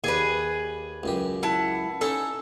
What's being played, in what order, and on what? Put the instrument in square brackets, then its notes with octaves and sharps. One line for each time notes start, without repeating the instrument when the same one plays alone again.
[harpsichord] D#2 D5 [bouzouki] G#4 B4
[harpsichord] C#2 F#2 G4
[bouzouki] E4 F#5 A5
[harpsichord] C#4 D#4 C#5 [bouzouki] A4